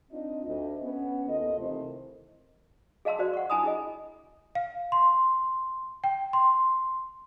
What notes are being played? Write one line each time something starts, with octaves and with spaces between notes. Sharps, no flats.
C4 D4 D#4 F4 D#5
D2 D#5
B3 C#4
D#2 F4 A4 D#5
C3 D#3 E3 A3 E4 C5
G#4 D#5 F5 A5 C6 E6
F#4 C5 D5
F#5 C#6
E4 G#5 A5 B5 D#6
E4 G#4 D#5
F5
C6
G5
C6